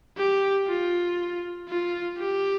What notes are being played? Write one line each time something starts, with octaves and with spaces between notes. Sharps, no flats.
G4
F4
F4
G4